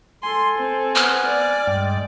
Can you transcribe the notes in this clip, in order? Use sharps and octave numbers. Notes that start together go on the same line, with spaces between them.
A4 G#5 C6
C4
B3 F6
D5
G2 G#3 G5